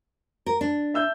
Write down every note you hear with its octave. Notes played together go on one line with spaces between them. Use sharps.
A#4
D4
E5 E6 G6